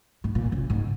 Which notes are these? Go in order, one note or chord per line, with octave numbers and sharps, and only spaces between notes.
G#2
A#2
C#3
G#2